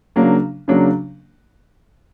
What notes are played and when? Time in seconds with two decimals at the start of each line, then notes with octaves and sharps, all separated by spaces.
0.16 C#3 F#3 A#3 D4
0.68 C#3 F#3 A#3 D4